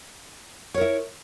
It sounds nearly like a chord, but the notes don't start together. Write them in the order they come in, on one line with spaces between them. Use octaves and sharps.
C#5 A#4 E4